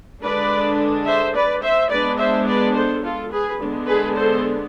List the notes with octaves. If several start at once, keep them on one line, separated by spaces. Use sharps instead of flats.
D3 G#3 D4 B4 D5
C5 E5
B4 D5
C5 E5
G#3 B3 D4 B4 D5
C5 E5
B4 D5
A4 C5
F4 A4
G#4 B4
D3 G#3 B3 D4
G#4 B4
A4 C5